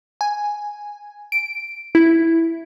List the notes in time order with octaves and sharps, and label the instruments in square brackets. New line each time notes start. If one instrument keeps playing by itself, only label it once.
[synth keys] G#5
D7
E4